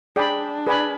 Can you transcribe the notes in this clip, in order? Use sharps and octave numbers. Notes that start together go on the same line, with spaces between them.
D4 G#4 D5 G5 B5
G#4 B4 D5 G#5 B5